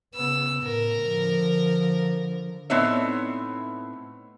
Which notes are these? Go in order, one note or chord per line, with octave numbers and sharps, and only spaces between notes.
C#3 B3 E6
A2 A#4
D3 F3
A2 B3 C4 D#4 C#5 E5